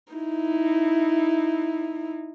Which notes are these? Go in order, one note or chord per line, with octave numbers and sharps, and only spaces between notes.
D#4 E4